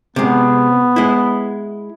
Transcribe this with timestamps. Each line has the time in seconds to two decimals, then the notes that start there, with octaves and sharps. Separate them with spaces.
0.16 C3 G#3 B3
0.96 G#3 E4